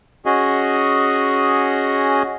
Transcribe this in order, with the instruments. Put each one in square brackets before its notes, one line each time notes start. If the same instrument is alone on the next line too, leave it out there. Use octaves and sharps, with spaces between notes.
[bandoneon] C#4 F#4 G#4 D#5